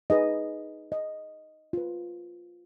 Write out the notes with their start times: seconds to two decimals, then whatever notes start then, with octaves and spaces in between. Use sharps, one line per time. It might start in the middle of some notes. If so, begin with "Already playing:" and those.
0.10 D#4 G#4 B4 D#5
0.92 D#5
1.73 F4 B4